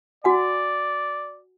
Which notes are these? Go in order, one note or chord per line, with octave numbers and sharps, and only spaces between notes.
F#4 D5 F#5 G#5